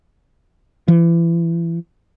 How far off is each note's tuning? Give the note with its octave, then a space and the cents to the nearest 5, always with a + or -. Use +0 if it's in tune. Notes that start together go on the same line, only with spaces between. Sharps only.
E3 +30